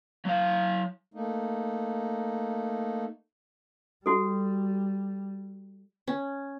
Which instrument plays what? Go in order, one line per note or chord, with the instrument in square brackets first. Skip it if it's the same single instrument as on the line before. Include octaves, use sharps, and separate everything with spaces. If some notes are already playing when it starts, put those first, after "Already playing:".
[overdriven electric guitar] F#3 F5
[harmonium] A3 A#3 D#4
[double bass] G3 [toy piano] F#4 A4
[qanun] C#4